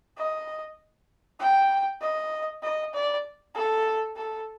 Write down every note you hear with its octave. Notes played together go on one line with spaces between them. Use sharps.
D#5
G5
D#5
D#5
D5
A4
A4